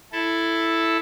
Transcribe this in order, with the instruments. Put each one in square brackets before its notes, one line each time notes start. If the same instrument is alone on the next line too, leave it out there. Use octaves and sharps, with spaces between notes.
[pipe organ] E4 A4